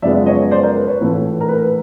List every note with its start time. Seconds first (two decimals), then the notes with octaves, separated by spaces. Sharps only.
0.02 F#2 C#3 F3 G#3 B3 D5 E5
0.26 C#5 D#5
0.51 C5 D5
0.63 A#4
0.76 B4
0.87 B4 C#5
1.00 A#1 A2 E3 A3
1.41 A#4
1.48 B4